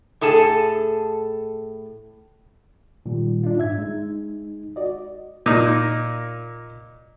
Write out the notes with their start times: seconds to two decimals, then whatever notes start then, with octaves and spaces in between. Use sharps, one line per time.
0.21 A2 G#4 A4 A5
3.06 A#2 D#3 G3 F4
3.43 D4 D#4 F4
3.58 G#2 E5 G#6
3.74 G#3 D#4
4.76 F#4 D5 D#5
5.46 A#2 D#4